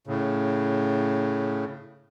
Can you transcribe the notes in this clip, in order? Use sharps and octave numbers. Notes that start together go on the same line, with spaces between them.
A2 C#3